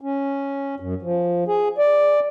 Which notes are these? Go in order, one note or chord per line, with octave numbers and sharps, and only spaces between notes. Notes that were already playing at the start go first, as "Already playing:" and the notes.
C#4
F#2
F3
G#4
D5